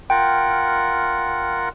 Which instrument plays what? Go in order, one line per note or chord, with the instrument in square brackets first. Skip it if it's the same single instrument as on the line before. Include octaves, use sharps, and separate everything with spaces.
[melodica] F4 A#4 F#5 [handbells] G5